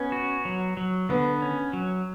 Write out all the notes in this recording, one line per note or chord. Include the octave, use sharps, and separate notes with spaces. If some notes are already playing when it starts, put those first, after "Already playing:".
Already playing: B3 C#4
F#4
F#3
F#3
D3 B3
C#4
F#3